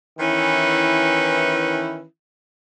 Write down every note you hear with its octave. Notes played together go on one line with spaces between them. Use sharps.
D#3 E3 C#4 E4 B4